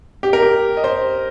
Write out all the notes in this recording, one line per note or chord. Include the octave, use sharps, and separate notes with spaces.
G4
A#4
G4
D#5
C5